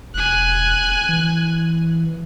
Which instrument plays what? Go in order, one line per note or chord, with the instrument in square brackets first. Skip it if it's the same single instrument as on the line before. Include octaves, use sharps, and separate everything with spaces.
[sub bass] E1 [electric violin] G#5 F#6
[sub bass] E3